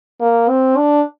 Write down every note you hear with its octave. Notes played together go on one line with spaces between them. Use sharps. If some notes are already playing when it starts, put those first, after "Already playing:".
A#3
C4
D4